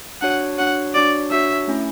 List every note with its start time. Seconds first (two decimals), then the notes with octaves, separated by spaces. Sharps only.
0.22 D4 F#4 C#5 F#5
0.58 D4 F#4 C#5 F#5
0.94 D4 F#4 C#5 D5
1.31 D4 F#4 C#5 E5
1.68 A3 C#4 E4